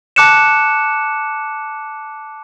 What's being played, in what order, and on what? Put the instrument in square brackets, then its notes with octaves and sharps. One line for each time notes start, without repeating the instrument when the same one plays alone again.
[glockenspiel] A5 D6 F#6 C#7 E7